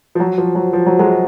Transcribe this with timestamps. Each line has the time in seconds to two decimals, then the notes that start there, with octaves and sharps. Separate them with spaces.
0.15 F3
0.20 F#3
0.38 F3
0.55 F#3
0.73 F3
0.86 F#3
0.99 F#3 G#3